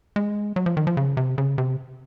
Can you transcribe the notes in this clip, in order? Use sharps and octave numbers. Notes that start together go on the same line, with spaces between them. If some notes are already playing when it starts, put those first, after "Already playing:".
G#3
F#3
F3
D#3
F3
C#3
C3
C#3
C3